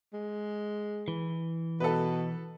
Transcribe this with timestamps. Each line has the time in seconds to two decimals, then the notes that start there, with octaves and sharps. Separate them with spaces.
0.13 G#3
1.08 E3
1.80 B2 A4 B4